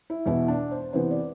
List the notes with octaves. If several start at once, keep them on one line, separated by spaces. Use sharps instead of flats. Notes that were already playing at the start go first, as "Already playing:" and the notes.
E4
E2 B2 B3 E4
D4
C5
C3 E3 B3 C5
D5